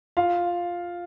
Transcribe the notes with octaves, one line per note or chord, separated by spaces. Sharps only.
F4 F5